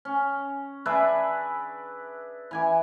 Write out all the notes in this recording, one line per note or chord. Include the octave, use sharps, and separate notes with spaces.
C#4
D4 G#4 B4 E5
E3 G#5 D6